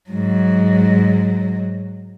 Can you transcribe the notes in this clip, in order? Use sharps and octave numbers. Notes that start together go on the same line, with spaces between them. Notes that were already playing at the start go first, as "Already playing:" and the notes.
G#2 F#3